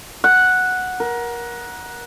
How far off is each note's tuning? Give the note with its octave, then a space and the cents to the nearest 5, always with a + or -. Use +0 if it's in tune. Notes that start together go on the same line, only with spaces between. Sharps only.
F#5 -5
A#4 +25